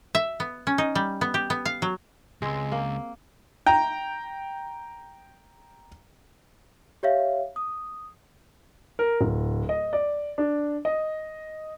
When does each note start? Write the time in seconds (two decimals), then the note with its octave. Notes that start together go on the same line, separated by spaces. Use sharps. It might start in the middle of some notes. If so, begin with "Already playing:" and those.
0.15 E5
0.40 B3
0.67 C#4
0.78 D#4
0.95 G3
1.21 B3
1.34 G4
1.50 B3
1.65 F5
1.82 F#3
2.42 C#2 G#3 C4
2.72 A#3
3.66 G5 A#5
7.03 G4 C#5 E5 F5
7.56 D#6
8.99 A#4
9.21 D1
9.69 D#5
9.93 D5
10.38 D4
10.85 D#5